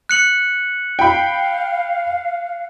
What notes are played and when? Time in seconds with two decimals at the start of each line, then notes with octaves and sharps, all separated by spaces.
0.09 F#6 C#7 F#7
0.99 F5 G5 B5